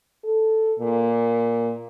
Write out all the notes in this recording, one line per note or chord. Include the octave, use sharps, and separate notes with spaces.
A4
A#2